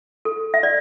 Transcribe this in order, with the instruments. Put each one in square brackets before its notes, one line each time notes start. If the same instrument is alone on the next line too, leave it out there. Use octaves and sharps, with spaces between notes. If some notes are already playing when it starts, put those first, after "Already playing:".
[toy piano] A4
E5
D5